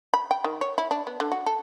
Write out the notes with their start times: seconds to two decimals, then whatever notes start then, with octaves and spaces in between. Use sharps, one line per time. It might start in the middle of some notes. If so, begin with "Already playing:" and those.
0.14 B5
0.31 G5
0.44 D#3
0.61 C#5
0.78 E4
0.91 D4
1.07 B3
1.20 D3
1.32 F#4
1.46 A4